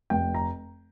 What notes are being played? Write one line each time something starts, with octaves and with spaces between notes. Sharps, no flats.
F1 G5
A#5